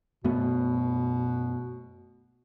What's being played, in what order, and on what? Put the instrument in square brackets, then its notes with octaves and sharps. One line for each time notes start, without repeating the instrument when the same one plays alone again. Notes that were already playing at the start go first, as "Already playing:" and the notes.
[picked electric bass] F#2 A3 B3 [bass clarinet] B2